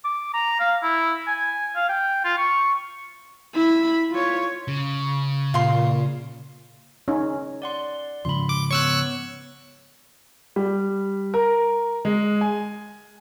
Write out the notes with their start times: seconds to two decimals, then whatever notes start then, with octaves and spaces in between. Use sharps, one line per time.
0.05 D6
0.34 A#5
0.60 F5
0.83 E4
1.27 G#5
1.76 F5
1.89 G5
2.24 F4
2.38 C#6
3.55 E4 B5
4.11 F4 C#5
4.68 C#3
5.54 A#2 F4 C6
7.08 C#4 D#4
7.62 D5 F#5 C6
8.25 G#2 C#3 F3 B5 C6
8.49 D6
8.71 B3 C#5 C#6 E6 F#6
10.56 G3
11.34 A#4
12.05 G#3
12.41 G#5